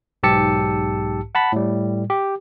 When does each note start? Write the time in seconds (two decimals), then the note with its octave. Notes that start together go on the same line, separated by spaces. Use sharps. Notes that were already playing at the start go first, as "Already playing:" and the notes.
0.23 B1 G#2 G4 A5 E6 C#7
1.35 F#5 A5 B5
1.52 A2 G3
2.10 G4